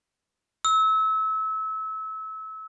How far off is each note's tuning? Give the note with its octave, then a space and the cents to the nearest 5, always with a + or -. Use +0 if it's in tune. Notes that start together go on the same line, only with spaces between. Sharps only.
E6 -30